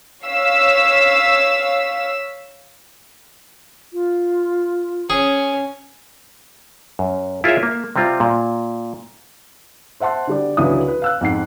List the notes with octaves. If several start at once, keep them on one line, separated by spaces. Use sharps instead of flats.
C#5 F5 E6 B6
F4
C#4 G#4 G#5
F#2
E4 F4 G#4 A#4 C#5 E5
A#3
C3 G3 C4 F4
A#2
C5 E5 F#5 A5 C6
D3 G3 D5
C#2 D3 E3 F#3 E4 D#6
B4
F5 E6 F#6
F2 G#2 F#5 C7